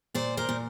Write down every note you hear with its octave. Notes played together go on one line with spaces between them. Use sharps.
A#2 C5 D5
A#4 C5
A#2